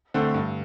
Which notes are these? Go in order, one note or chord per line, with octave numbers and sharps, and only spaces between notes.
D3 A3 C4
G2